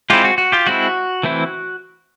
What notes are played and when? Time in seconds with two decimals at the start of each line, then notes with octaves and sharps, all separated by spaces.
0.10 G#3 C4 E4 F4 G4
0.24 F#4
0.38 F#4
0.52 F4 G4
0.67 G#3 C4 E4 F#4
1.23 E3 A3 C4 E4